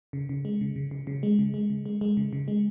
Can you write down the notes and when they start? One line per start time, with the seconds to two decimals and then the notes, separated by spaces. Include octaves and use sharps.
0.13 C#3
0.29 C#3
0.45 G#3
0.61 C#3
0.76 C#3
0.91 C#3
1.07 C#3
1.23 G#3
1.39 C#3
1.54 G#3
1.70 C#3
1.86 G#3
2.01 G#3
2.17 C#3
2.33 C#3
2.48 G#3